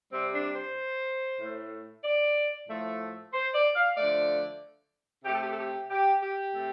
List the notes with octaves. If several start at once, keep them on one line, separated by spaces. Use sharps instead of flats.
C3 G3 C4
D4
C5
A2 A3
D5
A2 F3 A3
C5
D5
F5
D3 F3 A3 D5
C3 A3 G4 A4
G4
A4
G4
G4
G4
C3 A3